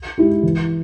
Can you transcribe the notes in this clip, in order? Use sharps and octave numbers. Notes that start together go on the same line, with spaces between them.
G#3 E4 G4
E3